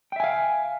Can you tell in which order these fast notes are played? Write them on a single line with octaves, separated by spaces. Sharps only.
G5 E5 G#5 F5